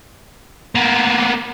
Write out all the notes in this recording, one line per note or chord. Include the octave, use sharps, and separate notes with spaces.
A#3 B3